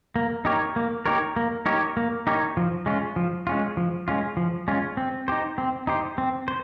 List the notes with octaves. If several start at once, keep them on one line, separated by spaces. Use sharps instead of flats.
A#3
D#4 G4 A#4 C#5
A#3
D#4 G4 A#4 C#5
A#3
D#4 G4 A#4 C#5
A#3
D#4 G4 A#4 C#5
F3
G#3 C#4 F4
F3
G#3 C#4 F4
F3
G#3 C#4 F4
F3
G#3 C#4 F4
C4
D#4 G4 C5
C4
D#4 G4 C5
C4
C5